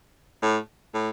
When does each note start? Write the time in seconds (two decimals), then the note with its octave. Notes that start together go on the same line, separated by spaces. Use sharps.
0.42 A2
0.94 A2